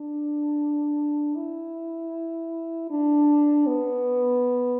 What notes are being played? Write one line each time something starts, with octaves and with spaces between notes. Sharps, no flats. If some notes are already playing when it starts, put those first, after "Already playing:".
Already playing: D4
E4
D4
B3